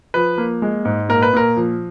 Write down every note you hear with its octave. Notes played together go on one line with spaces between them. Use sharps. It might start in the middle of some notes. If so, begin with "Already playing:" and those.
F3 B4
A#3
G#3
G#2
A#2 A#4
B4
A#2 A#4
F3